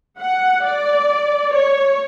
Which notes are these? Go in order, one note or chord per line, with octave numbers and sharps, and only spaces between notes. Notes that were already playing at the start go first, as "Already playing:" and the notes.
F#5
D5
C#5